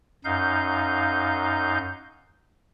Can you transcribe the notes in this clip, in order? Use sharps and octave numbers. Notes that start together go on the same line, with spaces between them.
F#2 D#4 F5 G6